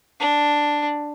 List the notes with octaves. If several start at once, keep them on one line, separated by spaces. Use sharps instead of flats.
D4